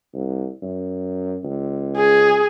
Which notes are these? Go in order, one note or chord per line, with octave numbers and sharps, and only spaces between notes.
C2
F#2
C#2
G#4